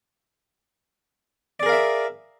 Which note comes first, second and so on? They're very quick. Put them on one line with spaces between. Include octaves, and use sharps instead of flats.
D5 G#4 A#4 F5 E5